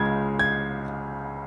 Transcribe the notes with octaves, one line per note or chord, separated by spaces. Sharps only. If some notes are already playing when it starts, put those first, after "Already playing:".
Already playing: C#2 C#3 G#3 G#6
G#6